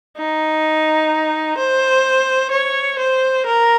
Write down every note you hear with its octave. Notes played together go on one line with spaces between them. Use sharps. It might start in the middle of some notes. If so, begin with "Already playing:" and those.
D#4
C5
C#5
C5
A#4